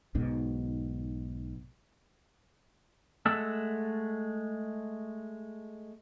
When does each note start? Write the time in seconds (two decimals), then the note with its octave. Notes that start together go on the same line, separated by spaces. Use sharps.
0.15 B1 G#2 B2
3.25 G#3 A3 F#5 A5 E6